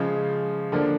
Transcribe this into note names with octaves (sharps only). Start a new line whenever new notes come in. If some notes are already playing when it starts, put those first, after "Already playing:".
Already playing: C#3 F3 G#3
D3 F3 A#3 D4